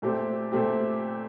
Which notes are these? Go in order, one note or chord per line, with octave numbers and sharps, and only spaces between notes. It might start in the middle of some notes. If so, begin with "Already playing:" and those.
A#2 A3 C4 G4
A#2 A3 C4 G4